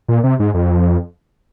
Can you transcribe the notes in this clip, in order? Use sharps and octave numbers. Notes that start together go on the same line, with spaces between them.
A#2
C3
G#2
F2